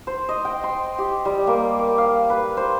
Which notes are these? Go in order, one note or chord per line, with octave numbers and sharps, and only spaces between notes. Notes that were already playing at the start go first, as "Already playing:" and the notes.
C5
D#5
G5
C6
G4
G3
A#3
D6
F5
B4
C5